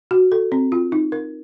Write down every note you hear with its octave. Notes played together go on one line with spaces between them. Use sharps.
F#4
A4
C4
F4
D#4
A#4